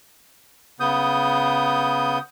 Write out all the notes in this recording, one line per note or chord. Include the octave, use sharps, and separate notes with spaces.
C#3 B3 D#6 G6